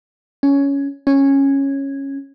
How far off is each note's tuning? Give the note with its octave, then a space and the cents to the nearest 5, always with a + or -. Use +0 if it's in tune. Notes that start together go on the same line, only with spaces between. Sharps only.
C#4 +10
C#4 -10